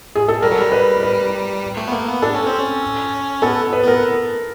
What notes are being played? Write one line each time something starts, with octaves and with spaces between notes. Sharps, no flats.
G#4
A4
G3 A#4
F#3
G3
B4
B4
A3
B3
A#3
B3
D4 A4
C#4
C4
C#4
B3 A4
B4
B3 A#4